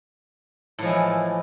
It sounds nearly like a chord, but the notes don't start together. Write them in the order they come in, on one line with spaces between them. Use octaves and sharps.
A2 F3 G#3 E3